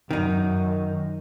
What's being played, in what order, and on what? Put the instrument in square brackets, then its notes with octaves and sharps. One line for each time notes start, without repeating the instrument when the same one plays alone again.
[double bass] F#2 [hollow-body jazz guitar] D#3 D#4